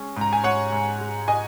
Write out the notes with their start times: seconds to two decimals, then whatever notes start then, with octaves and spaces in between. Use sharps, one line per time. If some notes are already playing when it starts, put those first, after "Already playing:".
Already playing: G#3 C#4
0.16 G#2 A#5
0.33 G#5
0.44 G#2 C#5 F#5
0.72 G#2
1.00 G#3
1.28 D#5 G#5